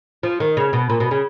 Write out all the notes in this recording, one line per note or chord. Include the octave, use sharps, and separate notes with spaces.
F3
D#3
C#3
B2
A#2
B2
C#3